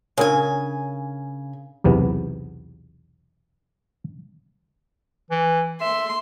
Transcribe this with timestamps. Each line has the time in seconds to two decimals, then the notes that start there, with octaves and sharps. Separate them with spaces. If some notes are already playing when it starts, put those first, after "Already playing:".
0.18 C#3 D4 A#4 C#5 G#5
1.84 B1 E2 C3 B3
5.31 E3
5.81 E5 C6